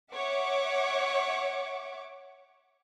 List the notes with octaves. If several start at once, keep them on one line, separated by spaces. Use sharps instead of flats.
C#5 E5 F#5 C#6 D6